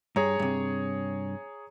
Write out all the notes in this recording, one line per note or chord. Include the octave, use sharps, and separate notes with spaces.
G2 G#4 C#5 A#5
G2 C3